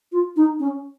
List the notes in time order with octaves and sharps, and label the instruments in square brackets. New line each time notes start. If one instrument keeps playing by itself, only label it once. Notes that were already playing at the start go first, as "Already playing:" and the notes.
[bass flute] F4
D#4
C#4